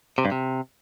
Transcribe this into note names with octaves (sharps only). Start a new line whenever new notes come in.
C3
G2
C3